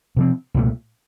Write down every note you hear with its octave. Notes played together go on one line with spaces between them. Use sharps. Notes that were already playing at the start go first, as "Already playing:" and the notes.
C3 F3 C4
C2 A#2 F3 A3